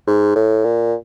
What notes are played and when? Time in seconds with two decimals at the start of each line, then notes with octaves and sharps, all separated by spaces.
0.07 G#2
0.35 A2
0.64 A#2